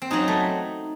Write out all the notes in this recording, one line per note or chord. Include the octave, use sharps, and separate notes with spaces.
C4
F#2 F#3 D#4
A3